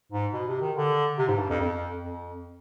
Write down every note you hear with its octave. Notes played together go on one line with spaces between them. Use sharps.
G#2
B2
C3
D#3
D3
C3
G#2
G2
F2
F2
F2